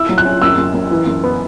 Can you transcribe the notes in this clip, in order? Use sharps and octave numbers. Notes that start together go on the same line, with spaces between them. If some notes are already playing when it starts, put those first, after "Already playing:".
Already playing: E4 E6
F#3
F#6
C#4
F#2 E6
F#2
F#2
E3
F#2
B3